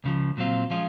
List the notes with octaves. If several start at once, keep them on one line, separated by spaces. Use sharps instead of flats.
C#2 C#3 F3
A#2 F#3 C4 F4
F3 G#3 C#4 F4